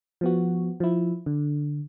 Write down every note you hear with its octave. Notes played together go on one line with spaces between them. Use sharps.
F3 B3 F#4
F3 E4
D3